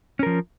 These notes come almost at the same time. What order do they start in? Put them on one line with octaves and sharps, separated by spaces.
C#4 A#4 F3